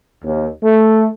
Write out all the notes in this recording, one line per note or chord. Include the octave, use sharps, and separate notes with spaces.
D#2
A3